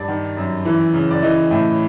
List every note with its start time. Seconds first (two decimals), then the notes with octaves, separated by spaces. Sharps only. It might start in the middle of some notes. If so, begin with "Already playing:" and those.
Already playing: G2 D5
0.08 D#3
0.37 F#2
0.65 E3
0.94 C#3
1.10 D5
1.23 E3 D#5
1.51 A2 E5